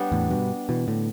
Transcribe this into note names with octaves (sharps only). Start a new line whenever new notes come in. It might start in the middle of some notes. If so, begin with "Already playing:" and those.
Already playing: G3 B3 D4
E2 A2
G2 B2
B2 E3
A2 D3